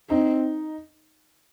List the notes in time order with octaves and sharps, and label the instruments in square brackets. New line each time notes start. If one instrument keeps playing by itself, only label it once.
[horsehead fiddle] C4 [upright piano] D#4